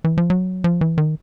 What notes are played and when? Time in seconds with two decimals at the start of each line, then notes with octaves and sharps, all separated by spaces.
0.04 E3
0.18 F3
0.30 F#3
0.64 F3
0.81 E3
0.98 D#3